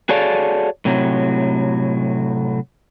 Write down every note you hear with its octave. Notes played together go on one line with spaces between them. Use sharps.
F#4 G#4 A4 C#5 D5 F5
A2 C3 F#3